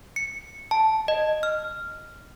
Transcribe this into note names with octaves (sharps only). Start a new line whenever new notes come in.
C#7
A5
D#5
F6